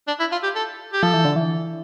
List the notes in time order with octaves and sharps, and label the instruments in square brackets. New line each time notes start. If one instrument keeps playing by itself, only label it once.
[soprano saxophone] D4
E4
F4
G4
A4
G4
[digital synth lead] F3 [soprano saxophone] A4
[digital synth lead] E3
D3
E3